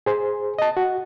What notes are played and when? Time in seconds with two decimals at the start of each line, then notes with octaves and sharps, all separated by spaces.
0.06 G#4 C5
0.59 D#5 A5
0.77 F#4